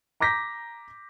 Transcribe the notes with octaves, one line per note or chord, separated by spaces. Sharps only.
A#5 D6 G6 A#6 B6